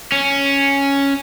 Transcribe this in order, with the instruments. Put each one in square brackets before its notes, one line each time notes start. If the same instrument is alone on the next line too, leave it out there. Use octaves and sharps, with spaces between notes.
[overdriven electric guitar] C#4